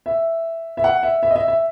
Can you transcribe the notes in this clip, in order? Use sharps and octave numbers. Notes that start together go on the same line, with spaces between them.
E5
E5
F#5
E5
E5
D#5
E5
E5